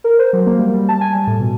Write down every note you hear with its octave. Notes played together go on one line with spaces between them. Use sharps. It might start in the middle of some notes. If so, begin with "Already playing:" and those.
A#4
C5
F#3
A#3
G3
G3
A5
G#5
G3
A2
B2